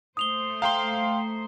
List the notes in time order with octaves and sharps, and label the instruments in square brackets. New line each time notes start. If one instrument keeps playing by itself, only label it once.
[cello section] A3 C5 [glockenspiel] D#6 F7 G7
[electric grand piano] F5 G5 C6 [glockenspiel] A#5 C7 G7